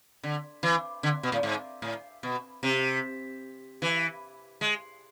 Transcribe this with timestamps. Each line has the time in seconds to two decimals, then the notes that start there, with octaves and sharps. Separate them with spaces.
0.24 D3
0.63 E3
1.03 D3
1.23 B2
1.32 A2
1.43 G#2
1.82 A2
2.23 B2
2.63 C3
3.82 E3
4.61 G#3